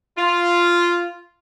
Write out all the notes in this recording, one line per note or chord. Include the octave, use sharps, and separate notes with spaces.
F4